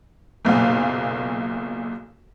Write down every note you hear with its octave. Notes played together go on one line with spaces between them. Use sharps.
F#1 B1 A#2 F5